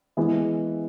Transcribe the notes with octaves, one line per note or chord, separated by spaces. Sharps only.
E3 G#3 B3 E4 G#4